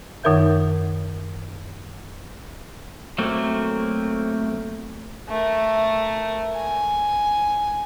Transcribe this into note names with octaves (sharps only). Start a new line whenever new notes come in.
F#2 D#3 D#4 A#4 E5 G6
F#3 A3 A#3 C4
A3 A#4
G#5